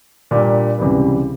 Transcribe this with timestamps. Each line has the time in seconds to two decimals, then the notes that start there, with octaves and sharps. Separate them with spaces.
0.31 A#2 G3 A#3 D4 G4
0.79 C#2 C3 E3 G3